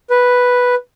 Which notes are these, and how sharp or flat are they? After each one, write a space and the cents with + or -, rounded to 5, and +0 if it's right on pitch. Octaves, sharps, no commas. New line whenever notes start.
B4 -5